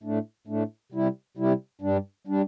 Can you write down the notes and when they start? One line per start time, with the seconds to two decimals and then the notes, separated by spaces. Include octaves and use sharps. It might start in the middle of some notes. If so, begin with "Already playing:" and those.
0.03 A2 A3 D4
0.47 A2 A3 D4
0.92 C3 G3 E4
1.37 C3 G3 E4
1.81 G2 G3 D4
2.27 G3 D4